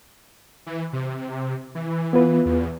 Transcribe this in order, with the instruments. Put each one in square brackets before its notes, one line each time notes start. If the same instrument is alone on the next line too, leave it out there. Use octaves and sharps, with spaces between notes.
[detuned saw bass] E3
C3
E3
[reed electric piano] B3 F4 B4
[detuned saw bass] E2